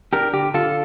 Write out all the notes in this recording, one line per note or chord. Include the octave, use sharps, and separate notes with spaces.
D4 G4 A#4
D3 G4
D3 F4 A4